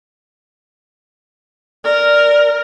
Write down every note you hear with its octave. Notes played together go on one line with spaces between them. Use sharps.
A#4 D5